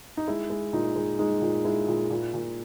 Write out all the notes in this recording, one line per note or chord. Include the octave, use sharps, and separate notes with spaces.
D#4
G#3 E4
G#3
A#2 D#4
G#3
G#3 D#4
A#2
G#3 E4
A#2
A#2
A#2